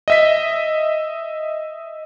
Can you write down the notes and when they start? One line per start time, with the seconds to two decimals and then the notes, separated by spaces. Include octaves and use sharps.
0.08 D#5 E5 B6